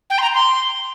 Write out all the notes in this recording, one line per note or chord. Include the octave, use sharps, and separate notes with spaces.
G5
C6
A#5
C6